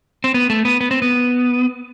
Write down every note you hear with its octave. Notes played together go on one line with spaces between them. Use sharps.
C4
B3
A3
B3
B3
C4
B3